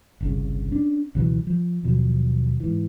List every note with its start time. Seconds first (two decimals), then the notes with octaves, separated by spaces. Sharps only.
0.21 G1 C2 C#3
0.72 C#4 D4
1.15 C#2 B2 E3 F#3
1.47 F3
1.84 D#2 B2 F3 F#3
2.60 G#2 E3